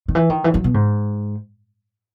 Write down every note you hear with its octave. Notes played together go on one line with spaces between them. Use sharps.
D#3
E3
D#3
E3
F#3
B2
G#2